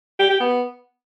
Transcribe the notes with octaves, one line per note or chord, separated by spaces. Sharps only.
G4
G4
B3